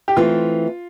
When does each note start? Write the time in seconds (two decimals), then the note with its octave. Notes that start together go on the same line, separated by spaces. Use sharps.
0.08 G4
0.17 E3 A3 C4 F4